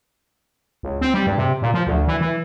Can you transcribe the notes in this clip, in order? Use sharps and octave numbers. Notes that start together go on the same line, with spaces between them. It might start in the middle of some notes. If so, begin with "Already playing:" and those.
C#2
C4
G3
G2
C3
A#2
F3
D2
E3
E3